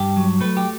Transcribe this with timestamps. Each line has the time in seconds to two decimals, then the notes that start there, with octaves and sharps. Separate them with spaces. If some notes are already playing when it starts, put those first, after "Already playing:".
Already playing: G2 G4
0.17 F#3
0.41 A3 B4
0.57 G4